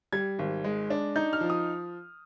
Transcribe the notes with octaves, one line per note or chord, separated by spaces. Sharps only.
G3 G#6
G#1
G#3
D4
D#4 G6
F6
F3
D#6